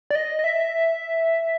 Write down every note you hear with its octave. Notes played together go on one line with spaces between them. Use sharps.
D5
D#5
D#5
E5